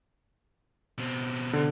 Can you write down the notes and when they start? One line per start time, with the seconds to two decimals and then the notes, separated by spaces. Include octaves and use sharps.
0.98 B2 C4
1.53 D3